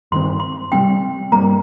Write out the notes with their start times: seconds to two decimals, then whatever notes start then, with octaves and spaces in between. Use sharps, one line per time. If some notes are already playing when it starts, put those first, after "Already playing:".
0.12 G2 D#3 C4 C6
0.40 C6
0.72 C3 G3 C4 G5
1.32 G2 G3 A#3 A#5